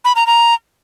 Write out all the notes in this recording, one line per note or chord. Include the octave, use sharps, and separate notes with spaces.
B5
A#5
A#5